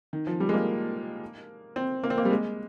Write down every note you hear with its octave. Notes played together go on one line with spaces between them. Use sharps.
D#3
F3
G3
G#3
A#3
C4
A#3
C4
A#3
G3
G#3